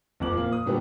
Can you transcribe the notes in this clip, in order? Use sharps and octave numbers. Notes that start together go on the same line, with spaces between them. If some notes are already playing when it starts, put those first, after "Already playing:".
F#1 F2 D6 F#7
A#2 A#3
D#6
G2 A#2 D3 B3 F#4 G4